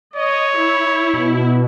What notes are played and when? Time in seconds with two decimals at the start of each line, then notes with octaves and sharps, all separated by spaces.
0.16 C#5 D#5
0.56 E4
1.14 B2